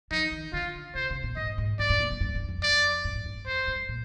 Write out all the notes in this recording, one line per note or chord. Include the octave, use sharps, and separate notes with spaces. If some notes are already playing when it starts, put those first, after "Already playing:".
F3 D#4
D#3
D3 F4
C3 C5
C3
A#2
G#2 D#5
G#2
G2 D5
G2
A#2
G2
G2
G2
F2
D5
G2
G#2
G#2
G2
F2 C5
G2
A#2